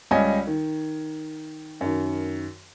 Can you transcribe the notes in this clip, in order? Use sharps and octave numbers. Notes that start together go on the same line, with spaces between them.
C#2 G3 C#5 D#5 G#5 G#6
D#3
F#2 D#3